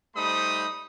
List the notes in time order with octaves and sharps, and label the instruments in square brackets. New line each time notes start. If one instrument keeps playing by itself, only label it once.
[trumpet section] G3 A3 D#4 C5 B5 D#6